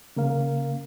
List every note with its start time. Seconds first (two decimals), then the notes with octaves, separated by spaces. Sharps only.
0.16 C#3 A#3 A#4 F5